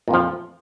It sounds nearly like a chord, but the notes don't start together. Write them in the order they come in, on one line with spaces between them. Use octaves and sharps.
A#2 F2 F3